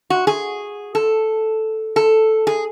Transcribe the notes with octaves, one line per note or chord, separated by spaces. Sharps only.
F#4
G#4
A4
A4
G#4